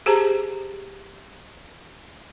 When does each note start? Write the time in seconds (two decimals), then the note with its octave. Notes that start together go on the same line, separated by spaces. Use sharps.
0.06 G4 G#4 C5 A5 A#5